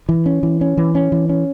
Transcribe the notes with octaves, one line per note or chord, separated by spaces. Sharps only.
E3
C#4
E3
C#4
E3
C#4
E3
C#4